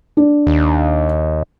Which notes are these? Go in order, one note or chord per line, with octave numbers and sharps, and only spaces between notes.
D4
D#2